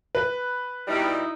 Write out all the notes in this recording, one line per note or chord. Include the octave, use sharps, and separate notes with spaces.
B4
B2 G3 D#4 E4 D#5